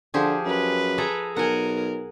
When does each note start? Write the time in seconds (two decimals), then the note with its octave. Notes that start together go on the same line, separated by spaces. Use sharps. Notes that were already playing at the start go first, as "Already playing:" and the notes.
0.14 D3 F3 G4 G#4
0.46 F#2 B4
0.98 G#4 A4 A#5
1.36 B1 A#4 F#5 G#5